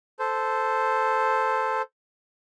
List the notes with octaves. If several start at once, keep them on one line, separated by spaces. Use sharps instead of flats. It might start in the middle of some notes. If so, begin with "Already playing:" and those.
A4 C5